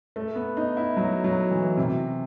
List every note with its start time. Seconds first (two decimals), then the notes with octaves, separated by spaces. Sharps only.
0.16 A3
0.36 B3
0.57 D#4
0.77 E4
0.97 F#3
1.24 F#3
1.51 E3
1.77 C3